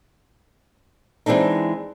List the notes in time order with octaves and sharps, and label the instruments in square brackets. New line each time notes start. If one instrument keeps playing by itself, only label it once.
[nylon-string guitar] E3 G#3 C4 D4 D#4